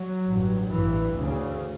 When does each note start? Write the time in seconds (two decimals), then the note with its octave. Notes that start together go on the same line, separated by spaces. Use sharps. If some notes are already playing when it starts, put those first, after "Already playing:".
Already playing: F#3
0.27 A1 G2
0.71 A1 G2 E3
1.16 D2 C#3